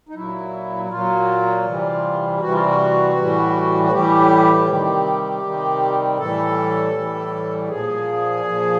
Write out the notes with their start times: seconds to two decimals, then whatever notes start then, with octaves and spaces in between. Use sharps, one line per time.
0.09 D#4
0.15 A#2 F#3 E4
0.85 E4
0.90 A#2 F#3 F4
1.66 C3 E3 G3
2.41 C3 E3 G3 F#4
2.53 F4
2.66 F#4
3.17 A2 E3 G3
3.83 F#4
3.92 A2 E3 G3 G4
4.67 C3 D#3 G3
5.42 C3 D#3 G3
6.18 A2 E3 G3 A4
6.94 A2 E3 G3
7.69 A#2 F3 G#4
8.44 A#2 F3